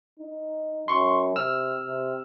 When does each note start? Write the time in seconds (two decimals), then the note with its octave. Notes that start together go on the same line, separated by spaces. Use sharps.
0.19 D#4
0.88 F#2 C6 C#6
1.36 C3 E6 F6
1.83 C3